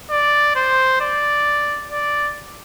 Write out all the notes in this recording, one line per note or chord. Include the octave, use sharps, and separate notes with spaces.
D5
C5
D5
D5